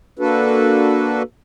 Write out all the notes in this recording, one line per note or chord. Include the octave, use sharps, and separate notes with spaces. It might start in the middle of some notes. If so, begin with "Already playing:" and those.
A#3 D4 F#4 A4 B4